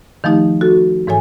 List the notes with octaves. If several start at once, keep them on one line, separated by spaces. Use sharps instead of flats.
D#3 F3 A3 D#4 G4
F#4 A4
G#2 E3 A4 C#5 G#5